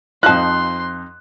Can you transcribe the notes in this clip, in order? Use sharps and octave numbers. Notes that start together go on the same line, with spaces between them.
F2 F3 D#4 A5 C6 F#6